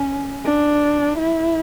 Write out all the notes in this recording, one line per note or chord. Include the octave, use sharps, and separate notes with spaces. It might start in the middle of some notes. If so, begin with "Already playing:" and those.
Already playing: C#4
D4
E4